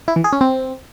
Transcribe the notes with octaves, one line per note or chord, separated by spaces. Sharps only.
E4
E3
G#4
C#4
C4